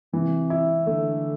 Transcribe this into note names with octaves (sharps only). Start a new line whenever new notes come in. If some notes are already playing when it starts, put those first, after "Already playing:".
C3 E3
E4
D3 A3